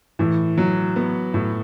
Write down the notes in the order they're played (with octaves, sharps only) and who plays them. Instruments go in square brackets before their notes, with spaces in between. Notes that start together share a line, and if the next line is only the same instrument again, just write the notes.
[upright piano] A2 [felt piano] E3
[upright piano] F#3
B3
A2